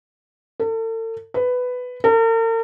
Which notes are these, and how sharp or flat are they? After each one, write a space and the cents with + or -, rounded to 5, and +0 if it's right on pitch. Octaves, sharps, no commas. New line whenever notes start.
A4 +40
B4 +10
A#4 -45